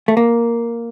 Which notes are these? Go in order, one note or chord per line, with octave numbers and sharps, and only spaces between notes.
A3
A#3